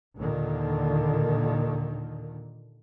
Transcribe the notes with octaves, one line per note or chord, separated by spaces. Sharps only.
D#2 A#2 D3 D#3